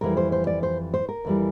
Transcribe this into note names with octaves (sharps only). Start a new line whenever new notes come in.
F2 E3 G3 A#4
C5
C5
D5
C5
C5
A#4
F2 E3 G3